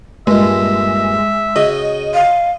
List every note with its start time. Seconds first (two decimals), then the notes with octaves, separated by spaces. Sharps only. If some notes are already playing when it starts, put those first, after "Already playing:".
0.27 G2 A#2 G#3 E5
1.56 C#3 F#4 D#5
2.14 F5